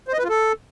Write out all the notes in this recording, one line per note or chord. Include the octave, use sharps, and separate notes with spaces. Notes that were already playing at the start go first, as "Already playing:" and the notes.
C5
D#5
B4
F4
A4